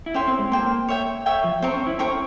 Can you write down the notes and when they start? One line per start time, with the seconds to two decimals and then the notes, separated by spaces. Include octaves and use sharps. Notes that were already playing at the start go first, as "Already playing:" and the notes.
0.06 E4
0.14 C#4 C5 G5 C6
0.28 C4
0.39 G#3
0.52 A#3 C5 G5 C6
0.89 C#5 E5 G5
1.26 C#5 E5 G5
1.44 F3
1.62 C4 C5 G5 A#5 C#6
1.75 C#4
1.87 E4
1.99 C#4 C5 G5 A#5 C#6